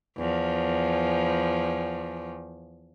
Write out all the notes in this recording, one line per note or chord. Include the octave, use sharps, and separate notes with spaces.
E2 F3